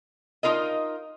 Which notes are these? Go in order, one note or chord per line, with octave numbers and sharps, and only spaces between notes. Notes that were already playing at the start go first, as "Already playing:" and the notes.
D#4 F4 A#4 D#5